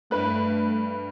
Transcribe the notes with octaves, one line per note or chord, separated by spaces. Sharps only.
G2 A3 B4 F#6